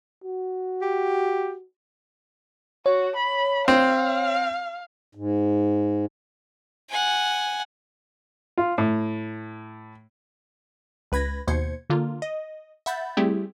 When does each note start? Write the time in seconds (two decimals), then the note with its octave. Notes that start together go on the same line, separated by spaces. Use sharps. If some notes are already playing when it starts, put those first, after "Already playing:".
0.24 F#4
0.82 G4
2.86 F#4 C#5
3.16 B5
3.68 C4 F5
5.15 G#2
6.90 F#5 G#5
8.58 F4
8.78 A2
11.12 C#2 B4 B5 G#6 A#6
11.48 D#2 B2 C5 G#6 C#7
11.90 D3 A#3 F4
12.22 D#5
12.86 E5 F#5 B5 G6 A6
13.17 G3 A3 C4 E4 G4 G#4